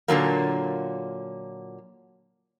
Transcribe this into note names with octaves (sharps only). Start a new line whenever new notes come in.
A#2 D3 F#3 A#3